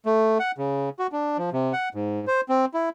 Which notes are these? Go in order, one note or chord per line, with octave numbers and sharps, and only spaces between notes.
A3
F#5
C#3
F#4
D4
F3
C3
F#5
G#2
C5
C4
E4